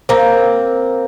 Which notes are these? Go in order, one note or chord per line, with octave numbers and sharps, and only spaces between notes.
A#3 C4